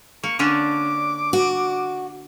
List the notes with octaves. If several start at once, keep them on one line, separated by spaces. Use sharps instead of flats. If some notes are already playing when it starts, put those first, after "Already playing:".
A#3 C#6
D3 C#4 D4 D6
F#4